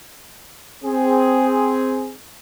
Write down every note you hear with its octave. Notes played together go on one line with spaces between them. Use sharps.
C4 G#4